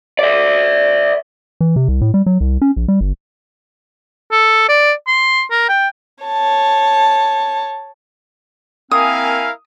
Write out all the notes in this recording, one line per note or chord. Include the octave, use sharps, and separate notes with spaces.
D5 E5
E3
C3
C2
A2
G3
F#3
C2
C#4
A#1
G3
G1
A4
D5
C6
A#4
G5
C#5 A5
A#3 C4 E4 A#4 F5 G#5 D#6